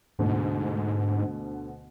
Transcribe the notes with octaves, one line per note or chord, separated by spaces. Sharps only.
D2 G#2 B2 D3